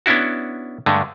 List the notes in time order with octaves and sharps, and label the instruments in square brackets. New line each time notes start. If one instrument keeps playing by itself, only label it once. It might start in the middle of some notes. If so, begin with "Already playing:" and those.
[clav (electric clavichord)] B3 C#4 D4 E4 F#4
G2 D3 G#3 A3